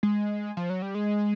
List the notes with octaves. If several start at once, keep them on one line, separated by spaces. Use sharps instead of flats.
G#3
F3
F#3
G3
G#3